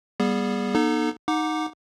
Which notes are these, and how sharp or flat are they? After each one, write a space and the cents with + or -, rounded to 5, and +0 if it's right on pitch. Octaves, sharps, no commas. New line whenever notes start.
G3 +0 B3 -40 G#4 +0
B3 -35 D#4 -15 A4 -5
D#4 +0 F#5 -20 D6 +0